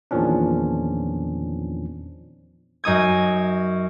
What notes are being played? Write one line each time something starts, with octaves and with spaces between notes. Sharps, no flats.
E2 A#2 D#3 F3 C#4 D4
F#2 D#4 D#6 G#6